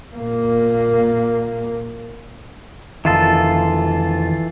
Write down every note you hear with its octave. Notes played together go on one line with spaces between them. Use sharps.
A#2 A#3
F1 D#3 E3 F4 A4